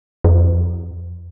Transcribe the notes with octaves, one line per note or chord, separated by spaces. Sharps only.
F2